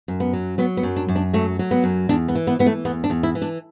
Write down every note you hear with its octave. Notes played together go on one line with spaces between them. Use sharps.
F#2
B3
F#3
F#3 B3
B3
F#2
D4
F#2
D4
F#3 A3
F#3
B3
F#2
E2 D4
B3
E3
B3
E3 B3
A3
E2 B3
D4
E2
E4
E3
D4